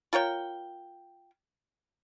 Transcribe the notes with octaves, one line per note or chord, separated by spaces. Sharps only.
F4 A#4 C#5 G5